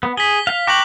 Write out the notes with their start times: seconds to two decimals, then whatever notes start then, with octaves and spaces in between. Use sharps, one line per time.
0.03 B3
0.17 G#4 B6 G7
0.47 F5
0.67 G5 A#5 C#6 D6 F#6 F#7